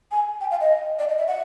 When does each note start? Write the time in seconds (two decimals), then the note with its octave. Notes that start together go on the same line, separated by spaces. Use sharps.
0.12 G#5
0.41 G5
0.51 F5
0.61 D#5
0.99 D5
1.09 D#5
1.18 E5
1.28 F#5